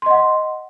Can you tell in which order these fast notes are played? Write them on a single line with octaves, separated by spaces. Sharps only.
C6 D#5 F#5